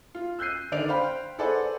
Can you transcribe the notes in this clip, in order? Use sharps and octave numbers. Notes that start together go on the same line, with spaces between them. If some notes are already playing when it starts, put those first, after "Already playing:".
F4
E6 F#6 G6 C7 D#7
D3 D#3 D5 D7 F7
C5 F5 G5 B5
G#4 A4 B4 C5 D5 F#5